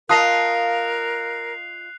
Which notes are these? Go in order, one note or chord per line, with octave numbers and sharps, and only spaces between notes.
F4 A#4 D#5 A5 D#6 F#6 C7 F7